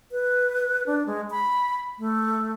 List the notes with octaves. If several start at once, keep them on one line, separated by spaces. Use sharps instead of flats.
B4
D4
G#3
B5
A3